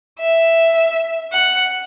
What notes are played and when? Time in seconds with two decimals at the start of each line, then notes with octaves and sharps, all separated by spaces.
0.20 E5
1.33 F#5